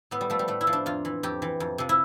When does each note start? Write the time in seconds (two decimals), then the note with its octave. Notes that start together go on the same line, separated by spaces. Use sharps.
0.11 A2 B3
0.21 G3
0.30 F3 A3
0.39 G3
0.48 A2 A3
0.61 E4
0.67 F3
0.73 D4
0.86 F2 F4
1.05 E3
1.23 F2 G4
1.42 E3
1.60 F2
1.78 C3 F3
1.89 E4